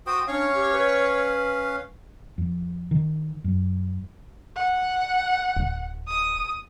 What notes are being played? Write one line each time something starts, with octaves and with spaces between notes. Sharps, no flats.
F#4 C5 G5 D#6
C#4 D4 C#5 F5
G4
B4
F2
D#3
F#2
F#5
D1
D#6